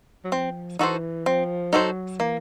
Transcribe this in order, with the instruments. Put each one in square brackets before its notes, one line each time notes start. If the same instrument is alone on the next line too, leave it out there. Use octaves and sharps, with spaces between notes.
[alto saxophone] F#3
[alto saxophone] F3 [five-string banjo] C4
[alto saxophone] E3 [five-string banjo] D#4 F#4 A4 C5
[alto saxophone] F3 [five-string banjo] C4
[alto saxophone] F#3 [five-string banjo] D#4 F#4 A4 C5
[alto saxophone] E3 [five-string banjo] A#3